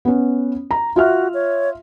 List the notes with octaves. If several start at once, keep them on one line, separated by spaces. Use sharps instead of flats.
B3 C#4
A#5
F4 F#4 E5 F6
C#5